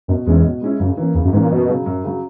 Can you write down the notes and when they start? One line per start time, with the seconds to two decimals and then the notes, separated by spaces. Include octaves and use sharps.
0.08 F#2 B2
0.26 E2 G#3 C#4 E4
0.44 B2
0.61 G#3 C#4 E4
0.80 F#2 C#3
0.97 E3 A#3 C#4
1.15 E2 C#3
1.25 F#2
1.33 G#2 E3 A#3 C#4
1.42 A#2
1.50 F#2 B2
1.69 C#3 F#3
1.86 F#2
2.04 C#3 F#3